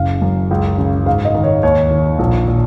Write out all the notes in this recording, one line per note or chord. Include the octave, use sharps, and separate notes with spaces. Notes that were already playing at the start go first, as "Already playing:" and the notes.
Already playing: F#1 C#3 F5
F#2
C#2
C#3
G#2 F5
D#5
D#3
C#5
D#2 C#5
D#3
A#1
A#2